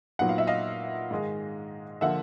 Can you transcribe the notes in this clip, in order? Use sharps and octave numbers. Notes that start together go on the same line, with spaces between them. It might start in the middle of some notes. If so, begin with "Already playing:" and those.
A#2 F#3 B3 D#4 F#5
F5
E5
D#5 F5
G#2 D#3 G#3
D3 F3 A#3 E5 F#5